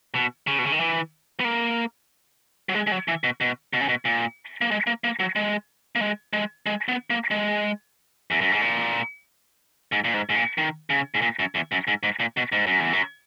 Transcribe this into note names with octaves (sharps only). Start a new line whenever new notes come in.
B2
C#3
B2
C#3
D#3
E3
B3
A#3
F#3
G#3
G#3
F#3
E3
B2
B2
B2
C#3
B2
A#2
A#3
G#3
A#3
A#3
F#3
G#3
A#3
G#3
G#3
G#3
B3
A#3
G#3
E2
F#2
G#2
A#2
G#2
A#2
G#2
G#2
A#2
D#3
C#3
G#2
A#2
F#2
E2
F#2
G#2
G#2
A#2
B2
G#2
F#2
E2
F#2